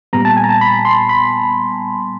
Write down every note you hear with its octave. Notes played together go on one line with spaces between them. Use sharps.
A#2 G3 B3 A#5
A5
G#5
A#5
A5
B5
C6
B5